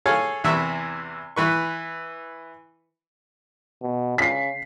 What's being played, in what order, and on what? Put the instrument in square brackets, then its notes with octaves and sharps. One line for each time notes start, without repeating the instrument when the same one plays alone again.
[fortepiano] G#4 A4 C#5 F5 G#5
E2 C3 E3 E5 C#6 E6
E3 B4 C#6
[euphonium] B2
[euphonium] C#3 [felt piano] B6 C7